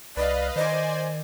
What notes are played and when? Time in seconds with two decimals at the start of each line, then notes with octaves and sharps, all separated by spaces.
0.17 C2 B4 D5 D#5 F5
0.56 D#3 C5 D5 D#5 G#5